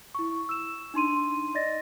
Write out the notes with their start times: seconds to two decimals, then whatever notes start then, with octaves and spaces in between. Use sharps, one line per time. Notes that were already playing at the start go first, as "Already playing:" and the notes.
0.15 E4 C#6
0.49 E6 E7
0.94 D4 D#4 C6 D#7
1.55 D5 D#5 A6 A#6